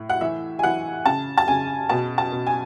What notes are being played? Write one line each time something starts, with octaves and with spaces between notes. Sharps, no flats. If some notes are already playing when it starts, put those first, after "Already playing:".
Already playing: A2
F#5
E3 E5
G#5
E3 F#5
C#3 A5
A5
C#3 G#5
B2 A5
A5
B2
G#5